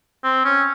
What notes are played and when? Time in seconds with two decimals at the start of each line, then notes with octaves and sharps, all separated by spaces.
0.24 C4
0.45 C#4